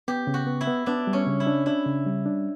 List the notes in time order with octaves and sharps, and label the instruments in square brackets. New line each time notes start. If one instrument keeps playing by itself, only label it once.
[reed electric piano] B3 [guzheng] G4
[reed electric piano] C#3
[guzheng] F#4
[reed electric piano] B3
[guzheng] E4
[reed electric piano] B3
[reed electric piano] B3 [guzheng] D4
[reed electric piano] G3
[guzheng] C#4
[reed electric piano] C#3
[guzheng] E4
[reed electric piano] D4
[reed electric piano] D4 [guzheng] E4
[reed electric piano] C#3
G3
D4